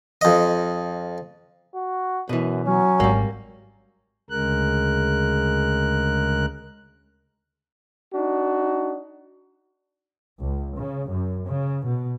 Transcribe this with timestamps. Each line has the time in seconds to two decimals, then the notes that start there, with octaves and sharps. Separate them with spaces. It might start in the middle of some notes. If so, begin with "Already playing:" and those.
0.21 F2 D#5
1.74 F#4
2.29 F#2 B2 E3
2.65 F#3 C#4
3.00 G#1 G3 A#3
4.30 D2 C#3 G#3 A#4 F#6
8.13 D4 D#4 F#4
10.40 C#2
10.77 C#3
11.10 F#2
11.48 C#3
11.86 B2